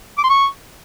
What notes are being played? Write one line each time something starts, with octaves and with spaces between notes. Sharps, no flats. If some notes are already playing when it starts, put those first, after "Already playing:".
D6
C6
C#6